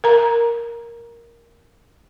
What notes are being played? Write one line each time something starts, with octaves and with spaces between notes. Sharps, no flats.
A#4 A#5